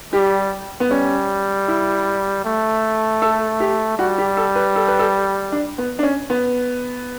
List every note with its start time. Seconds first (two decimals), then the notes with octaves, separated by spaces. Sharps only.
0.13 G3 G4
0.80 B3
0.90 G3 C#4
1.68 E4
2.44 A3
3.22 A4
3.60 G4
3.98 G3 F#4
4.18 G4
4.37 A4
4.55 B4
4.76 A4
4.88 B4
4.99 A4
5.52 D4
5.78 B3
5.99 D4
6.03 C#4
6.30 B3